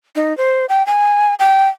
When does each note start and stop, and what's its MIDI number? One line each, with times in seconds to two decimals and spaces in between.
0.16 0.36 63
0.38 0.66 72
0.69 0.86 79
0.86 1.34 80
1.39 1.67 79